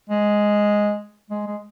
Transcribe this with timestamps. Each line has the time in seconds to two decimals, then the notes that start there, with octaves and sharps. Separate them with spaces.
0.09 G#3
1.30 G#3
1.47 G#3